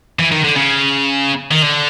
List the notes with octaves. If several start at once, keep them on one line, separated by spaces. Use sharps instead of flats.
E3
D#3
D3
C#3
D#3
D3